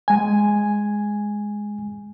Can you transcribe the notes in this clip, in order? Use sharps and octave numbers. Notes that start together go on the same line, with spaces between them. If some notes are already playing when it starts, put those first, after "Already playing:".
G#3 G#5